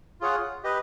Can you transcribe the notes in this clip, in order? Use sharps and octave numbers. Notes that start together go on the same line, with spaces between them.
F4 G#4 C#5 F#5
G4 B4 D#5